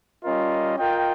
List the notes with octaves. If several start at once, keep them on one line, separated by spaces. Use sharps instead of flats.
G3 C#4 F4 A#4 D#5
F4 A#4 D#5 G5